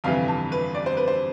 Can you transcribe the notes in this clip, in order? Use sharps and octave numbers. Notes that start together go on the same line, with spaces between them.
G1 F2 C3 E3 F5
A5
B4
D5
C5
B4
C5